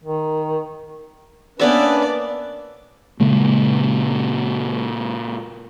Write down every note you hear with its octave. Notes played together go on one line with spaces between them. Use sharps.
D#3
A#3 B3 C#4 D4 B4 D5 E5
A#2 C#3 G#3 A#3